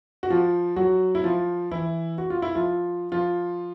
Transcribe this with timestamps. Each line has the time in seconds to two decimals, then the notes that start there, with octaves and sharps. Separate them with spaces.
0.23 F#4
0.30 F3 F4
0.76 F#3 F#4
1.15 E4
1.24 F3 F4
1.71 E3 E4
2.18 F#4
2.30 F4
2.42 E4
2.55 F3 F4
3.12 F3 F4